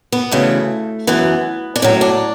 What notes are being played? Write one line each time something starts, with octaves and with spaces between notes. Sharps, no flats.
B3
D2 C#3 E3 A3
F#2 E3 B3
D4
A2 F#3 C#4
D4